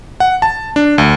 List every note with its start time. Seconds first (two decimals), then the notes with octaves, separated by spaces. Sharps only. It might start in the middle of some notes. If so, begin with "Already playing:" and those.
0.20 F#5
0.42 A5
0.76 D4
0.98 D2